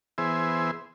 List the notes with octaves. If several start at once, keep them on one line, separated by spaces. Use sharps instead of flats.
E3 B3 G#4 C5 E5